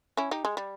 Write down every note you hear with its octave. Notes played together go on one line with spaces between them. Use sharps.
C#4 E4
D#4 G4
G#3
G3